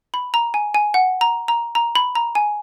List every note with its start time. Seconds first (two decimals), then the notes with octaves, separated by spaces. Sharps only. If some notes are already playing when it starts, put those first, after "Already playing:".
0.14 B5
0.34 A#5
0.54 G#5
0.75 G#5
0.94 F#5
1.21 A#5
1.48 A#5
1.75 A#5
1.95 B5
2.15 A#5
2.35 G#5